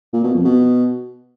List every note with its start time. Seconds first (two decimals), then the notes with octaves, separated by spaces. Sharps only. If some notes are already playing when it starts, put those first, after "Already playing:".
0.13 A#2
0.24 B2
0.35 F2
0.45 B2